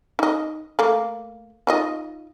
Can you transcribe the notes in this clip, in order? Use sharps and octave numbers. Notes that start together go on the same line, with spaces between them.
D#4 D#5
A3 A#3
D#4 F4 D#5